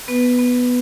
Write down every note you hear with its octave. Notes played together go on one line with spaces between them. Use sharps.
B3 B4
B3